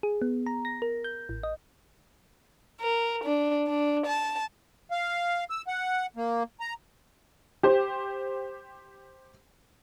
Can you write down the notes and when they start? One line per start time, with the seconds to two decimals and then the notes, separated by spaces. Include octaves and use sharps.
0.03 G#4
0.22 B3
0.46 A#5
0.65 A#6
0.82 A#4
1.04 G6
1.29 A1
1.43 D#5
2.80 A#4
3.24 D4
3.68 D4
4.06 A5
4.91 F5
5.50 E6
5.67 F#5
6.16 A#3
6.60 A#5
7.63 G4 C5